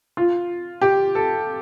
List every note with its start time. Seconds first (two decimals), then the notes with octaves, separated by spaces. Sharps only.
0.17 F4
0.81 G4
1.15 A4